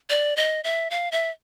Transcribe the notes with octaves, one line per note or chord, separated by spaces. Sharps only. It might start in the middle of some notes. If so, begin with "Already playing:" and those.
D5
D#5
E5
F5
E5